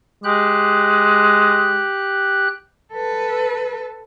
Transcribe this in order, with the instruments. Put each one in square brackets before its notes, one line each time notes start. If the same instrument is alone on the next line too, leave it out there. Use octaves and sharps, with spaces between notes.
[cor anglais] G#3 [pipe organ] G4 F#6
[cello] A4 B4